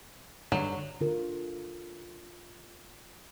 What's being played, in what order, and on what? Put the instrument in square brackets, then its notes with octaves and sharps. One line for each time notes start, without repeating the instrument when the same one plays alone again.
[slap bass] G2 D3 [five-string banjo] F#3
[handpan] D3 F4 A#4